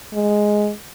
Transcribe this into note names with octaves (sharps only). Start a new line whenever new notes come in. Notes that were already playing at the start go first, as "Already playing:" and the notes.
G#3